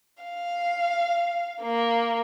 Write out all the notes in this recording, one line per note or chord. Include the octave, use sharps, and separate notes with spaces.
F5
A#3